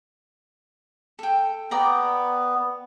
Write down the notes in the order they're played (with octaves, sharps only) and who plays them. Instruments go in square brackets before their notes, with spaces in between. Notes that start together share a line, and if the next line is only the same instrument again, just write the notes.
[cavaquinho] A4 G5
[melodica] B3 [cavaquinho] D5 G5 A#5